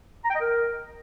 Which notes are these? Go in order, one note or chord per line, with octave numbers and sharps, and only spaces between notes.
A#5
G5
D#5
A#4